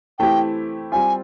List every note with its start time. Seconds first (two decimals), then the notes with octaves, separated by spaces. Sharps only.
0.19 E3 A3 C4 E4 G4 G5
0.92 G3 C4 F4 G#5